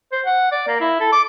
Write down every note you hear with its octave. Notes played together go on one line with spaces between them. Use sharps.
C5
F#5
D5
A#3
E4
A4
D6